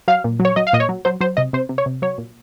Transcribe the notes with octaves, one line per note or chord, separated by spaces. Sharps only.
F#3 F5
A#2
F#3
C#5
F#3 D#5
F5
A#2 D#5
C#5
F#3
F#3 C5
F#3 C5
C3 D#5
C3 C5
C3
C#5
C3
F#3 C#5
A#2